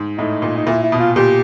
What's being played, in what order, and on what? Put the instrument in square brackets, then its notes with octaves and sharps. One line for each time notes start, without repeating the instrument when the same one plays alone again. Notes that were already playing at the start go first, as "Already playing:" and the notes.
Already playing: [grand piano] G#2
[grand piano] A2 [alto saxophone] D#4
[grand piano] A#2
[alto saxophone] D#4
[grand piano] A#2 [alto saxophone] E4
[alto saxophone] E4
[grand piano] B2
[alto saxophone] F4
[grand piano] A#2 [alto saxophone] G4